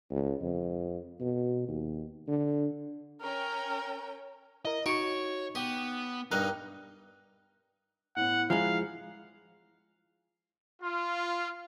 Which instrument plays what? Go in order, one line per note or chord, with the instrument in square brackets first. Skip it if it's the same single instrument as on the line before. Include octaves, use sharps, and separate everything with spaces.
[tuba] C#2
F2
B2
D#2
D3
[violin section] C#4 G5 [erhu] A#4
[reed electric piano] E4 A#4 [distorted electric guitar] D#5
[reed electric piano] D#4 [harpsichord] F#4 [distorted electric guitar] C#5 [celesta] C#6 C#7 D7
[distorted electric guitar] B3 [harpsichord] G4
[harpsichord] G2 F5 [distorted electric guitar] D#4 [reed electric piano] A#4 G5 [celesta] F#6
[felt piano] A2 B3 [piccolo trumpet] F#5
[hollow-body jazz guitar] F3 G#3 [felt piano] E4 G#5 A#5 [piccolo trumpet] F5
[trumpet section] F4